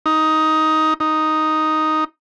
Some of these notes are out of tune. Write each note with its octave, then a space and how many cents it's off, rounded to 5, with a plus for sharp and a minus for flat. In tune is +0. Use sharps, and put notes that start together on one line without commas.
D#4 +10
D#4 +0